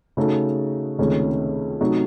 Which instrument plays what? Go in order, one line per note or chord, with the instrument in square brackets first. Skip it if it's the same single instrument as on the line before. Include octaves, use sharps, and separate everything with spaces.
[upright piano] C#3 A3 D#4 F#4 A4
C#2 C3 D#3 A3 C#4
C3 F#3 A3 D#4 F#4